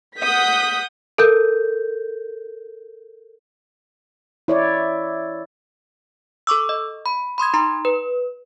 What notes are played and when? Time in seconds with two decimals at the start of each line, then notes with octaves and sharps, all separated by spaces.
0.19 F#5 D#6 G6 B6
1.18 A4 A#4 G6
4.48 E4 C#5 D5
6.47 A4 C#6 D6 E6
6.69 D#5
7.06 B5
7.38 B5 C6 D#6 G#6
7.54 D#4 A#5 C6
7.85 B4